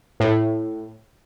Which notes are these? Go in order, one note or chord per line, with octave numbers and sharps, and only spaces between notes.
A2